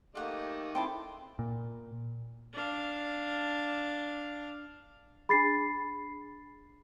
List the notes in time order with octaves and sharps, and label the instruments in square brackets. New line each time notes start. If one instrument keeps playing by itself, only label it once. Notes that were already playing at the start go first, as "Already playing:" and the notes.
[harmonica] D#3 A3 D#5 [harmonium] A#3 G4 [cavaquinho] F5 F#5
[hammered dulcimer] C4 E4 [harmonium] G#4 [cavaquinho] G5 A5 C6
[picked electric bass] A#2
[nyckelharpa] D4 F5
[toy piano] D4 G#4 [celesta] B5 A6 C7